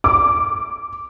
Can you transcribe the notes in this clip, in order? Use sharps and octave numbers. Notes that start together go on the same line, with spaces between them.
D6